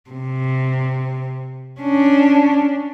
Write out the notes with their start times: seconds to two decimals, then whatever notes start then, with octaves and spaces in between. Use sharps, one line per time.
0.10 C3
1.81 C#4 D4